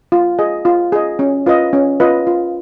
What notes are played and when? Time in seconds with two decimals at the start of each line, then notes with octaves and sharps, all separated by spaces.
0.12 F4
0.39 G#4 D#5
0.65 F4
0.92 G#4 D#5
1.19 C#4
1.46 F4 B4 D#5
1.73 C#4
2.00 F4 B4 D#5
2.27 F4